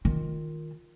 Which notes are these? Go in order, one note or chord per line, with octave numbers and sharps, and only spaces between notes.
D#3 F4